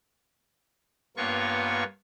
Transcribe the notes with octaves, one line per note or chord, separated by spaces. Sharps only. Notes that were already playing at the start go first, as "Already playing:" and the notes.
G2 A#3 B3 F4 C#5 C#6